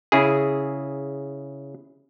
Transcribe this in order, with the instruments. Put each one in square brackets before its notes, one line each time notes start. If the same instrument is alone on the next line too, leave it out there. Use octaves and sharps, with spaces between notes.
[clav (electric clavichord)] C#3 E4 G#4